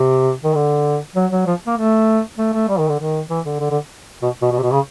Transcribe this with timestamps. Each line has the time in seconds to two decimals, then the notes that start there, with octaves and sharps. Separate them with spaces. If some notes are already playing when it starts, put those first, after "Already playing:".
Already playing: C3
0.44 D#3
0.55 D3
1.15 F#3
1.32 F#3
1.47 F3
1.67 A#3
1.77 A3
2.38 A3
2.53 A3
2.69 G3
2.79 D#3
2.89 D3
3.00 D#3
3.29 E3
3.45 D3
3.60 D3
3.71 D3
4.22 B2
4.42 B2
4.52 B2
4.58 C3
4.62 B2
4.72 C#3